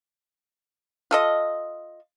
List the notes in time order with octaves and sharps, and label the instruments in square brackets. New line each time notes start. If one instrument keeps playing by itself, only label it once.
[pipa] F4 A4 D#5